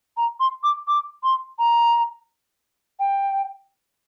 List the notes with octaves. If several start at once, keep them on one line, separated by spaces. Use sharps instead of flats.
A#5
C6
D6
D6
C6
A#5
G5